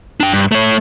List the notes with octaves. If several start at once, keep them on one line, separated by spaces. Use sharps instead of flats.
D4 G5
G2
A3 C#5